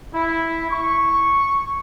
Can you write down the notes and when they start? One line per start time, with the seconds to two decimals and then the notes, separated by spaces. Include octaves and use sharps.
0.12 E4
0.70 C#6